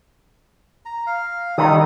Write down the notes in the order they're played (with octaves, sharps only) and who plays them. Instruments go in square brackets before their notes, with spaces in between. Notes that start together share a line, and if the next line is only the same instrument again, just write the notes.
[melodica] A#5
F5
[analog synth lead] D#3 [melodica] G3 A4 D#6